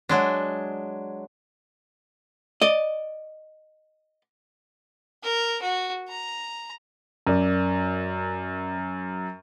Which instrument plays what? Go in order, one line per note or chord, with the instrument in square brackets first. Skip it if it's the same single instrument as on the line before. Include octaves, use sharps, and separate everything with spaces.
[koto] F#3 G#3 D4
[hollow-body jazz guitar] D5 D#5
[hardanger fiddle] A#4
F#4
A#5
[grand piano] F#2 [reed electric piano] C#4 A#4 D5